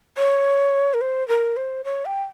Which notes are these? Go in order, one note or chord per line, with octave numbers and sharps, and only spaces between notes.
C#5
A#4
C5
A#4
C5
C#5
G5